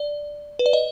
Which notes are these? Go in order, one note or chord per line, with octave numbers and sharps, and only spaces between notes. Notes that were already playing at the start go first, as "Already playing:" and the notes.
Already playing: D5
B4
D5
D#5